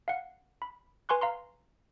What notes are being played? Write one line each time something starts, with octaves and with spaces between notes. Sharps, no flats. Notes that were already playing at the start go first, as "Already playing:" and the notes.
F5 F#5
B5
B4 G#5 C6 C#6 F#6
F5 A#5 C6